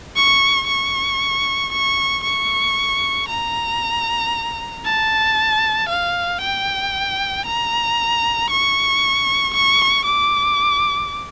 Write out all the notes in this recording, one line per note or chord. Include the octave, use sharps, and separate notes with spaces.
C#6
C#6
C#6
C#6
A#5
A5
F5
G5
A#5
C#6
C#6
D6